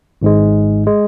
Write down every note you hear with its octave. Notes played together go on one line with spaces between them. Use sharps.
G#1 G#2 G#3
G#3